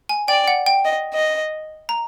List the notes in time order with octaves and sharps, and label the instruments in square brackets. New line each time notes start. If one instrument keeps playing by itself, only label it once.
[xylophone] G#5
[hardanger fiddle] D5 [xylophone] G5
[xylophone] F#5
G5
[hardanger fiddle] D#5
D#5
[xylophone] A#5